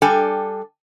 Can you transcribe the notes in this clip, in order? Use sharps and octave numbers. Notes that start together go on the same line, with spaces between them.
G3 D4 A4 G5 G#5